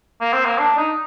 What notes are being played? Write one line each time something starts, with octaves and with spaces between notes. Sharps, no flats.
A#3
C4
A#3
D4
D#4